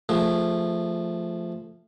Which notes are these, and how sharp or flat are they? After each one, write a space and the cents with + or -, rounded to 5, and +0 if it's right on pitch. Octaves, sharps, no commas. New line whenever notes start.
F3 -10 A3 +0 G#4 -25